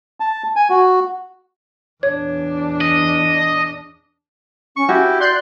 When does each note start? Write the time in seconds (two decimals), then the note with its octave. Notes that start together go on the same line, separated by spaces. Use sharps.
0.20 A5
0.56 G#5
0.70 F#4
2.03 E2 D4 C#5
2.81 D#5
4.76 C#4 C#6
4.89 E4 F#4 G4
5.20 D5 C6 F#6 G6